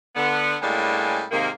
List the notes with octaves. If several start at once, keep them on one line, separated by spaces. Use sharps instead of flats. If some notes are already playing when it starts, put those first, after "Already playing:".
D3 B3
A2 G3 G#3 A#3 C#4 D4
G#2 C3 D#3 A#3